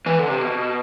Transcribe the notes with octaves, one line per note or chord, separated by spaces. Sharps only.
E3
D3
C3
B2